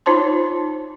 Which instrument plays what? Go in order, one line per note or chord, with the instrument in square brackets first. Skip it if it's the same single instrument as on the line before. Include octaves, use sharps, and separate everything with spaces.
[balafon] D#4 F4 C5 C#5 A5 C6